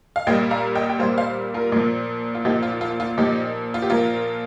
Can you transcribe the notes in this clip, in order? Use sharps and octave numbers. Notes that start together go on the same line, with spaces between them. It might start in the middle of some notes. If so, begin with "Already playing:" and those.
F5
A#2 G3 D#5 G5
F5 A#5
D#5 G5
G5
A#2 G3 C5 F5
C5 F5
F4 A#4
A#2 F3
F4
A#2 F3 D#4 G4
F4
F4
F4
A#2 F3 D#4 G4
F4
G4
A#2 F3 F4 A#4